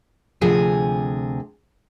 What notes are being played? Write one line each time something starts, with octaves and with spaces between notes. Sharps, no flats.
D2 C3 F3 G#4 G#5